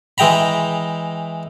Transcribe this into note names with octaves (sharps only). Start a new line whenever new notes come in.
E3 G#3 G5 A#5 B5